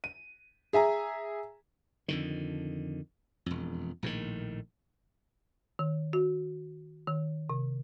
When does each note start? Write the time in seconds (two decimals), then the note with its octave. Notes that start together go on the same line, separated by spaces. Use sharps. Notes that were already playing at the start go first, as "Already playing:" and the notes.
0.04 D#7
0.73 G#4 E5 G#5 A#5
2.08 F2 D3 D#3
3.46 E1 F2
4.03 A#1 A2 D3 D#3
5.79 D#3
6.13 F#4
7.07 D#3
7.50 C3